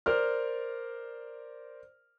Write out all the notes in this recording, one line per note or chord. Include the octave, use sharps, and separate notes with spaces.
A#4 C5 D5 F6